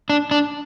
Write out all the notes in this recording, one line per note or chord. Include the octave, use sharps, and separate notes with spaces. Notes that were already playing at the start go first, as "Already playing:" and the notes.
D4
D4